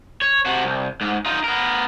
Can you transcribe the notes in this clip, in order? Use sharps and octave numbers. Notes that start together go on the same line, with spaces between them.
C#5
C3 F#4
C2
G#2
D#4 F4
B3 A#4